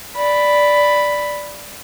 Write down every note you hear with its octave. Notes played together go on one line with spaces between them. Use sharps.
D5 B5